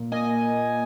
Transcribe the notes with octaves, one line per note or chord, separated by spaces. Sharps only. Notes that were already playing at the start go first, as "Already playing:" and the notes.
Already playing: A#2
A#3 D#5 G#5